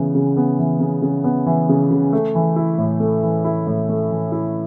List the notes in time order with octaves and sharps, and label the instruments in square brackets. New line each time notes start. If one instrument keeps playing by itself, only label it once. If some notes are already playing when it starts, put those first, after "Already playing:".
Already playing: [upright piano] C#3 E3 B3
C#3
B3
E3
C#3
C#3
B3
E3
C#3
C#3
A3
E3
E4
A2
A3
E3
E4
A2
A3
E3
E4